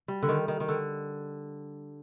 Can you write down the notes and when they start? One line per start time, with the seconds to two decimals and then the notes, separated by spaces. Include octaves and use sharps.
0.08 G3
0.23 D3
0.29 D#3
0.48 D#3
0.60 D#3
0.68 D3